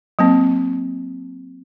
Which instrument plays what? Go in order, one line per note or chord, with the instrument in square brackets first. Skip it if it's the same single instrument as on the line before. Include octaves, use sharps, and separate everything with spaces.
[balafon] F#3 A#3 C4